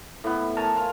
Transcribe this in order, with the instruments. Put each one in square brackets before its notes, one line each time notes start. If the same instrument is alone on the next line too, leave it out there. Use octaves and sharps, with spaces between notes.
[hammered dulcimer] A2 B3
A#4 C#5 G#5 A5
F4 A#4 F5